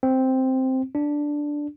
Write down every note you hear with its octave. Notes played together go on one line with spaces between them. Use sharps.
C4
D4